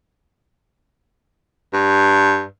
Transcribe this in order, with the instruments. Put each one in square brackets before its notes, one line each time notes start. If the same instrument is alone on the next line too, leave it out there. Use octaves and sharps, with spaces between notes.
[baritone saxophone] G2